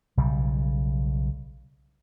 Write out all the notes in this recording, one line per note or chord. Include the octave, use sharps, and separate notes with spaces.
B1 C#3 G3